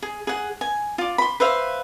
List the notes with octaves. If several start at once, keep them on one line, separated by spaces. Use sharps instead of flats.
G#4
G#4 F#5
G#5
F4 D5
B5 C6
B4 C5 E5 F5